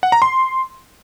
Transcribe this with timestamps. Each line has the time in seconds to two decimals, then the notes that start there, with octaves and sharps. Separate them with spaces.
0.03 F#5
0.12 A#5
0.22 C6